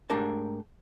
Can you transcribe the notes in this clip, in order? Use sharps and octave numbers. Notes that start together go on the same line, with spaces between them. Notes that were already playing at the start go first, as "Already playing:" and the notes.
G#2 A3 D4 G4 A#4 A5